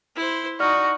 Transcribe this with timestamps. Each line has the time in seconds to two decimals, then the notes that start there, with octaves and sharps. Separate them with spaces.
0.16 E4 C5
0.60 D#4 F#4 D5 F6